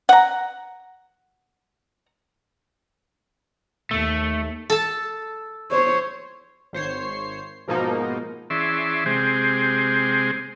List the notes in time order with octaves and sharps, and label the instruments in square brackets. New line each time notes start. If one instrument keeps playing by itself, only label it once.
[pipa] F#5 A#5
[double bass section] D#2 [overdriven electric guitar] A3
[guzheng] A4 A5
[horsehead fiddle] C5 C#5
[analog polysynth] G#1 C5 C#5 C7
G#2 B2 F3 A#3 D#4
[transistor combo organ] E3 C#4 G#4 D5 E5 C6
C3 G#3 C4 G4 G#4 C5